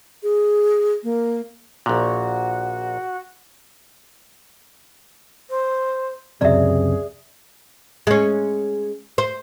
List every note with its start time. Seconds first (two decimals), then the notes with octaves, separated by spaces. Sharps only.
0.23 G#4
1.03 A#3
1.86 A#1 A#2 F#4
5.50 C5
6.41 C#2 F#2 C3 G#4 D5 E5
8.07 G#3 C#4
9.18 C5